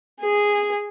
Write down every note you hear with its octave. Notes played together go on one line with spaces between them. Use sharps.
G#4